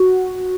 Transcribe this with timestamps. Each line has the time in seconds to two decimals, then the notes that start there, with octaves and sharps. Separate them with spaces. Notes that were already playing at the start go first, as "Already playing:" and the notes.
Already playing: F#4